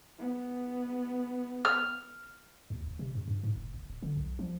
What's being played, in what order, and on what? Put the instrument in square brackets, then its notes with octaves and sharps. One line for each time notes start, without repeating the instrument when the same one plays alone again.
[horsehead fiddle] B3
[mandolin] F6
[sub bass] D#2
F#1
C3
F2
G2
G#2
F1
F#1
D#1
D3
B1
F3